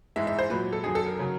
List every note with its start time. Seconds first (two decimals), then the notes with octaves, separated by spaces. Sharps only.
0.16 G#2 E3 G#3 E5
0.27 E5
0.39 C5
0.50 A#2 F#3 B4
0.72 A4
0.84 F#2 D#3 F#3 G#4
0.95 A4
1.06 A#4
1.19 C#3 F#3